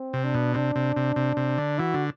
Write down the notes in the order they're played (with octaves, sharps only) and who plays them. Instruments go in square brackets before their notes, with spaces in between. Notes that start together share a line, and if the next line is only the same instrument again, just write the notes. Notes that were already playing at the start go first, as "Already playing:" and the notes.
Already playing: [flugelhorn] C4
[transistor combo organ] C3
[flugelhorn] D4
[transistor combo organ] B2
[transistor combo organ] C3 [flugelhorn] D4
[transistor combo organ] C3
C3
C3
C3
D3
[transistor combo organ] E3 [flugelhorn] F#4
[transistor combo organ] D3